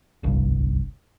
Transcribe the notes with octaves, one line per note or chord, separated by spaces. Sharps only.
D1 G1 C2 G2